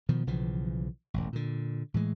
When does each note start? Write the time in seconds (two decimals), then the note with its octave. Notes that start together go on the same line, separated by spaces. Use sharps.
0.09 B2 D#3 F3
0.27 B1 C#3 E3 F3
1.14 E1 A1
1.33 A#2 D3
1.94 A2 E3 G#3